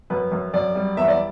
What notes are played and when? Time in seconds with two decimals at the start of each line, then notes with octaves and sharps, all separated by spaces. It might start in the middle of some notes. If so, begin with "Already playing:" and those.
0.10 F#2 B4
0.32 F#2
0.54 F#2 D5
0.75 G3
0.97 E2 E5
1.08 D5